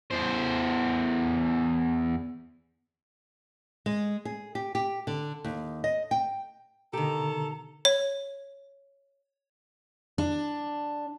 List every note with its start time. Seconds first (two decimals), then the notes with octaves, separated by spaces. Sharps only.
0.11 E2 C5
3.86 G#3
4.25 G#4
4.55 G4
4.75 G4
5.07 D3
5.44 D#2
5.84 D#5
6.11 G5
6.93 B2 D3 D#3 G4 A4 A#5
7.85 C#5
10.18 D4